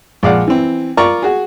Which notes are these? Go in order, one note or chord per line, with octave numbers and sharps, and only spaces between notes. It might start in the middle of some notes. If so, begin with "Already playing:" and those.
A#1 G#3 D5 F5 F#5
E3 C4
F4 A#4 D5 A#5 C#6
F#4 G#4